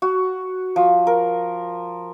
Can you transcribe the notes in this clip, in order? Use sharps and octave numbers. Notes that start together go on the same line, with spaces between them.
F#4
F3
A#4